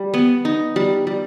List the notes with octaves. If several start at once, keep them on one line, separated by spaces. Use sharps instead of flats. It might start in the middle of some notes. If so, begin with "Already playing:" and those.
Already playing: G3
B3
D#4
G3
G3